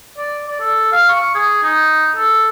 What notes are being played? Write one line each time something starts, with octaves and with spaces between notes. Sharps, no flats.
D5
D5
A4
F5
C#6
G#4
D#4
A4